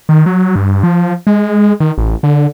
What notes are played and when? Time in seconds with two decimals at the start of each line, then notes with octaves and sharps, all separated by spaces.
0.09 D#3
0.26 F#3
0.56 G2
0.83 F3
1.27 G#3
1.80 D#3
1.98 A1
2.23 D3